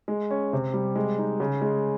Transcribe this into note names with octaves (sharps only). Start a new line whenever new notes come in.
G#3
C#4
C3
G3
G#3
D#4
C#3
G#3